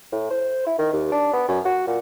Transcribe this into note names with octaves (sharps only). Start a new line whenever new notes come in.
A2
C5
E4
D#3
D#2
D4
B3
F#2
F#4
A#2